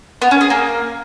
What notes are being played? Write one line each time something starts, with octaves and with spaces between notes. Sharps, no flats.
B3
C#4
G#4
A#3